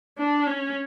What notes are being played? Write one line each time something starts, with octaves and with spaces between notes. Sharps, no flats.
D4
C#4